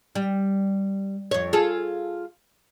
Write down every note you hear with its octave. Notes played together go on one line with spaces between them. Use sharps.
G3
F2 C#5
F4 G#4 A4